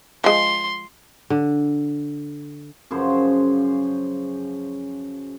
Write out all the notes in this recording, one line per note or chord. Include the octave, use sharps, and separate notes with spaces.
F3 G#3 C6
D3
F#2 C#3 F3 C5